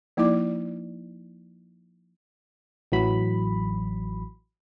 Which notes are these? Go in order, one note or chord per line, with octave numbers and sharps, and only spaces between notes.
F3 A#3 D#4 E4 D5 D6
A1 E3 F#3 B5